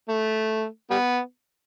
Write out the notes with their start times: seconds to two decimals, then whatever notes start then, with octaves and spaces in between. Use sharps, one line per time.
0.08 A3
0.90 G3 B3